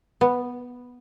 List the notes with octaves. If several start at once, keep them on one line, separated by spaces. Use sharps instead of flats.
B3